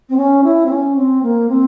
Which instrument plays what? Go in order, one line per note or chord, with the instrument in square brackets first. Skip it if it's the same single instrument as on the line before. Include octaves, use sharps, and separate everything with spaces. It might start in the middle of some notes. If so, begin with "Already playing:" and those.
[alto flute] C4
C#4
E4
C4
C#4
C4
A#3
C4